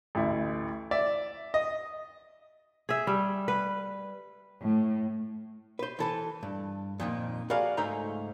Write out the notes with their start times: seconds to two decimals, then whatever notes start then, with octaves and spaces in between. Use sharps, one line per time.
0.15 A1 D2 E4
0.91 D5 E5
1.54 D#5
2.89 G#4 E5
3.07 G3
3.48 B4
4.62 A2
5.79 B4 C5
5.99 E3 A4 B4
6.43 G2
7.00 F2 A#2 D#3
7.50 F#4 G#4 A#4 B4 D5 F5
7.77 C#2 G#2 A3 D#4 C5 A#5